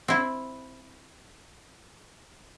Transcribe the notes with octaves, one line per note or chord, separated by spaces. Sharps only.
C4 E4